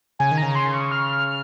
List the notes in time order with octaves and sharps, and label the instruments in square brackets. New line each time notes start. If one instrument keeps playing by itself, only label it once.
[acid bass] C#3 [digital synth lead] G#5
[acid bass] D#3
[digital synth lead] A#5
[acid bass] C#3
[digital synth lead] C6
C#6
F6
F6